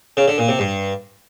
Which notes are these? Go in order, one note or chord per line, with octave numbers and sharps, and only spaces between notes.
C#3
D3
A#2
C3
G2